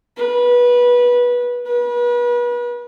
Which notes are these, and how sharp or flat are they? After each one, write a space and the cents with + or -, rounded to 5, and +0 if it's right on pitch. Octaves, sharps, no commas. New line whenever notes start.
B4 -20
B4 -35